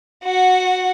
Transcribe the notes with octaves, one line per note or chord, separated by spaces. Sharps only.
F#4 F#5